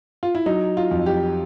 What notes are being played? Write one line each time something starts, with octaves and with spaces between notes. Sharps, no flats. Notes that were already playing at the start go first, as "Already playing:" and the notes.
F4
E4
F#3 D#4
F4
F2
G4